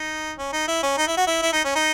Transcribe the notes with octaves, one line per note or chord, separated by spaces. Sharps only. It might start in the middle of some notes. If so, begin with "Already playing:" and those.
Already playing: D#4
C#4
D#4
E4
C#4
D#4
E4
F#4
E4
E4
D#4
C#4
D#4